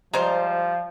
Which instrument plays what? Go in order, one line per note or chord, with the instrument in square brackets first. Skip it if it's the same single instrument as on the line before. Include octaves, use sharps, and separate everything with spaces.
[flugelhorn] F3 [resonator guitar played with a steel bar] G3 A#5 [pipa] G#3 C5